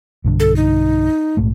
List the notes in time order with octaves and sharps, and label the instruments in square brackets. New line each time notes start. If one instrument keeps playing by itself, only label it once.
[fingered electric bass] B1 G2 D3
[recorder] A4
D#4
[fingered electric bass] A#1 G#2 A3